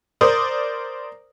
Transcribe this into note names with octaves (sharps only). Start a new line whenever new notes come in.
A#4 C5 D5 D#6